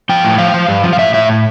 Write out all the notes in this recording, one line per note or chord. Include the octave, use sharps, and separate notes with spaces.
F3 G5
A2
F3 F5
F3
G2
F3
F5
A2 E5
A2 E5